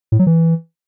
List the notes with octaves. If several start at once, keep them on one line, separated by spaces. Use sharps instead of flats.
A2
F#3
E3